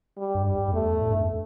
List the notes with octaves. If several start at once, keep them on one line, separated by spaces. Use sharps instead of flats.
G3
G2
G3
G2
G2
E2 A3
A2
G2
E2